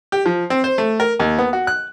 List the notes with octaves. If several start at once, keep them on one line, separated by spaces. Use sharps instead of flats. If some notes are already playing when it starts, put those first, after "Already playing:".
G4
F3
C4
C5
A3
A#4
D#2
B3
F#4
F#6